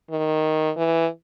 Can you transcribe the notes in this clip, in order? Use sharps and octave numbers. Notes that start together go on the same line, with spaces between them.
D#3
E3